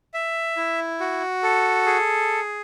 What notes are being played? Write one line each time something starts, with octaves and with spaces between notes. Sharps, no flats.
E5
E4
F#4
A4
G#4